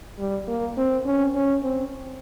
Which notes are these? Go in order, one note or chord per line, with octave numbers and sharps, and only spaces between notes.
G3
A#3
C4
C#4
C#4
C4